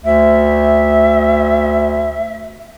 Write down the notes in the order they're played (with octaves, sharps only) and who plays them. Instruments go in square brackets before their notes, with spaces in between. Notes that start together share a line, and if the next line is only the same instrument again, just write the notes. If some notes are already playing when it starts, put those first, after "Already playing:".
[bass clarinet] D2 [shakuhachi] E5